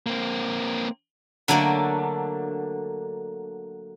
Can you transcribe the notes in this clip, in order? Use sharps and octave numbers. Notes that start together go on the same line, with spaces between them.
A#3 C4
D3 F#3 A3 A#3 D4